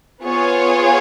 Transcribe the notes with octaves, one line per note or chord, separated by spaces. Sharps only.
B3 F4 G#4 C#5